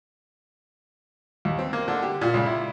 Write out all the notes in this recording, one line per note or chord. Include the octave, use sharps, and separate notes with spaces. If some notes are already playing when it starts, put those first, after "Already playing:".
D#2
C4
A#3
D3
G4
A#2
C#2
E4